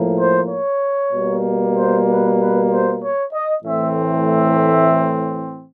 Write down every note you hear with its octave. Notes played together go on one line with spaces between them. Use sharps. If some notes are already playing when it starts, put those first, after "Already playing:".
Already playing: A2 F3 A#3
C5
C#5
B2 G3 A#3
C5
B4
B4
C5
C#5
D#5
A2 E3 A3 C4 E5
E5